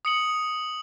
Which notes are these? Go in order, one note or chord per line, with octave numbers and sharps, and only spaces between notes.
D#6 C#7 F#7